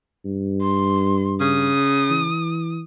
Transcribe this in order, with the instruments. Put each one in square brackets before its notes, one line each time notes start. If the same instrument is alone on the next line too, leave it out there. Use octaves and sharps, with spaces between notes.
[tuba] G2
[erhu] C6
[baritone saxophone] C#3 [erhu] D#6
[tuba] E3